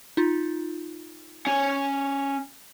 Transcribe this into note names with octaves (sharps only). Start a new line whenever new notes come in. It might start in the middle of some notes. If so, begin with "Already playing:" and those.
D#4 F4
C#4 G#5